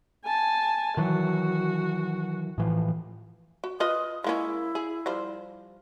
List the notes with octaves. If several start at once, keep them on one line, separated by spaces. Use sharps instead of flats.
G#5 A5
D#3 E3 F#3 F#4
A2 E3 F3
F#4
F4 B4 D#5 D#6
G#3 A#3 C#4 E4
G#4
F3 G3 C5